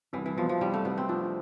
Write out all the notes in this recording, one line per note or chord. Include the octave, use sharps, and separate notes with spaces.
C2 E3
E3
B2 F3
F3
C2 G3
A3
C2 B3
C4
F3 D4